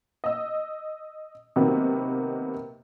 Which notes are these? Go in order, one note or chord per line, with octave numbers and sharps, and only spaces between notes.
D#5 E6
C3 D#3 F#3 A#3 B3